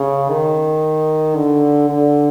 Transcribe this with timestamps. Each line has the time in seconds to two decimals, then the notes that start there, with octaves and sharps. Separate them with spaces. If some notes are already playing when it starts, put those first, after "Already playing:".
Already playing: C#3
0.29 D#3
1.35 D3
1.89 D3